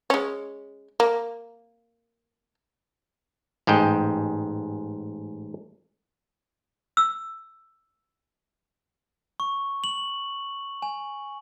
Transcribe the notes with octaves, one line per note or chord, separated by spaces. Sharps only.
G#3 C#4
A#3
A1 G#2 D#5 G5
E6
C#6
F#7
G#5